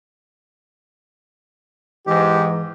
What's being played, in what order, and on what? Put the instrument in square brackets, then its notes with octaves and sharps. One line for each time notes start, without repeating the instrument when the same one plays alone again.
[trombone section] G#2 [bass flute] E3 [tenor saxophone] G4